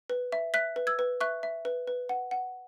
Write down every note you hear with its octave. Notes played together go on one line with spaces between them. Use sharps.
B4
E5
E5 F#6 B6
B4
E6 G#6
B4
E5 C#6 F#6
E5
B4
B4
F#5
F#5